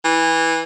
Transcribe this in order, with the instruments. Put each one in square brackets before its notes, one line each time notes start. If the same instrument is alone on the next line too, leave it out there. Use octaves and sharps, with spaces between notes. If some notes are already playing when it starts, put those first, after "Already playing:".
[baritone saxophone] E3